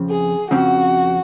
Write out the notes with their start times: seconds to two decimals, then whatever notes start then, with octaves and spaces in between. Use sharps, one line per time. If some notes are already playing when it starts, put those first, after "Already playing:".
Already playing: F2 C#3 F3 C4
0.09 G#4
0.51 F2 C#3 F3 C4 F#4